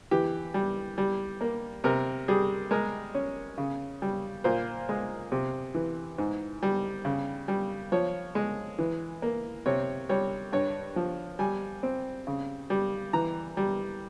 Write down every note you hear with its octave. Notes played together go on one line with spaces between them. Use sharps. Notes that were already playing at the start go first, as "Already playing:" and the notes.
E3 G4
G3
G3
A#3
C3 A#4
G3 G#4
G#3 A#4
C#4
C#3
G3
A#2 C5
G#3
C3
E3
G#2
G3
C#3
G3
F3 C#5
G#3
E3
A#3
C3 C#5
G3 C#5
G2 C#5
F3
G3 G#5
C4
C#3
G3
E3 A#5
G3